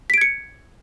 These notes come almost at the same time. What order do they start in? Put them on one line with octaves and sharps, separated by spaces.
B6 D7 G#6 C#7